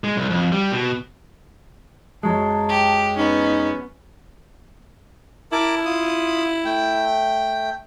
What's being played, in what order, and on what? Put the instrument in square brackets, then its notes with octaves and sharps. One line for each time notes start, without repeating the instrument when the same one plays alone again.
[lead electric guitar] G#3
C2
F2
G3
B2
[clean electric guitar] F#2 F#3 G#3 [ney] A5
[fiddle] G4
[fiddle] B3 C#4 [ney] D#4
[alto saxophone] E4 [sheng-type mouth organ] A#4 A5 D6
[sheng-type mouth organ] F4 D#6
A3 G5